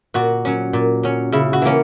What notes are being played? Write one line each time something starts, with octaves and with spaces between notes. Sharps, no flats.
A#2 F#4
F#3 C#4
A#2
F#3 C#4
C#3 E4
F#4
E3 A#3 C#4